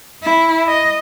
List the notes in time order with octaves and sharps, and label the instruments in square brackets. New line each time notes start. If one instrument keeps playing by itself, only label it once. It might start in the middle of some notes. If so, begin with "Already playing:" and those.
[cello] E4
D#5